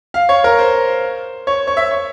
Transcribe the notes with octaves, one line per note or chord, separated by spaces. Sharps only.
F5
C#5
A#4
C5
C#5
C#5
E5
C#5